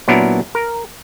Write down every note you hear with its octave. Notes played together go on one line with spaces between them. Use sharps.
A#2 F#3 B3 D4 E4 A#4
A#4